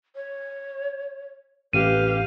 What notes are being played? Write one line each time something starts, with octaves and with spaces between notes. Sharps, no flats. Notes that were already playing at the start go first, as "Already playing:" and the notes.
C#5
A1 G4 B4 F5 D#7